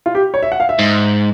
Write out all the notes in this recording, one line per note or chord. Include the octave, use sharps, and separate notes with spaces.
F4
G4
C#5
E5
F#5
F5
E5
G#2